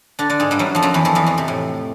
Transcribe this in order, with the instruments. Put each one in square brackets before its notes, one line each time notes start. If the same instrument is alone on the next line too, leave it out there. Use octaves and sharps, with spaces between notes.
[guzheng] D3 D4
D3 D4
G#2 G#3
G2 G3
F#2 F#3
F2 F3
F#2 F#3
E2 E3
F2 F3
E2 E3
F2 F3
C3
A2